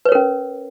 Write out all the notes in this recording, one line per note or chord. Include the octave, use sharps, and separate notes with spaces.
C#4 A#4 B4 C#5